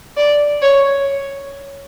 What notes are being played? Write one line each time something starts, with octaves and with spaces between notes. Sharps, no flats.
D5
C#5